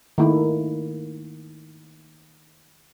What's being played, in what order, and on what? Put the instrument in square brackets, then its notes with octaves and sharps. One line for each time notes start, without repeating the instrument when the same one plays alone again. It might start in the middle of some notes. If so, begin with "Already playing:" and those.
[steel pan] D#3 A3 A#3 E4